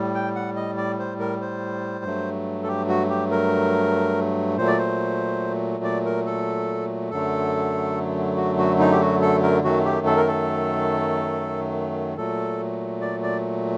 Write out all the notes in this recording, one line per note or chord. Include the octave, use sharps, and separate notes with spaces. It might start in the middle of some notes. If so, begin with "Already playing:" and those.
Already playing: A2 G3
G5
F#5
D#5
D5
C5
A#4
C5
G2 F#3 A3
A4
G4
F#4
G4
A#4
A#2 F#3 A3 C5
D5
C5
D5
A#4
A4
F#2 D3 F#3 A3 A4
F#4
F#4
D#4
G4
F#4
A4
A#4
F#2 D#3 F#3 A3 F#4
G4
A4
A#4
A4
A#2 F#3 A3 A4
D5
D5